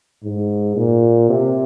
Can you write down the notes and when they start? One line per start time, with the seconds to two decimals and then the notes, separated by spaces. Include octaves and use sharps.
0.24 G#2
0.76 A#2
1.30 C3